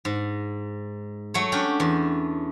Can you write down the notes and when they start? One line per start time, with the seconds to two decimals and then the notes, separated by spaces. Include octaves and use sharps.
0.05 G#2
1.34 F#3 A3 C#5
1.52 C#4 D4 G4
1.80 E2